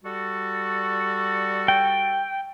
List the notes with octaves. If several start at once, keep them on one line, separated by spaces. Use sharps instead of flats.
G3 F#4 A4
G5